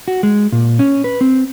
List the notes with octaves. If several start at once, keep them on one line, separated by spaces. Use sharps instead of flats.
F#4
G#3
A#2
C#4
B4
C4